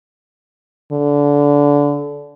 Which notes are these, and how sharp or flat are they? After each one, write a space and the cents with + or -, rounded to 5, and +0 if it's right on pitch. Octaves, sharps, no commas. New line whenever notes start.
D3 -25